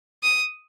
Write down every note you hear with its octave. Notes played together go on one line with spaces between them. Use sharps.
D#6